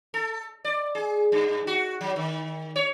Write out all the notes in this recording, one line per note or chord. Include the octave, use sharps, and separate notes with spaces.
A4
D5
G#4
G2
F#4
F#3
D#3
C#5